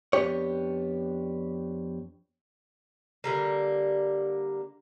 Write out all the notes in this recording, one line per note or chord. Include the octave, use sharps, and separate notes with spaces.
F2 B3 D4 G4 C#5
D3 G3 A#3